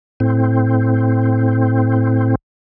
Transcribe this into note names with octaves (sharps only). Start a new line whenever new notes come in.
A2 C4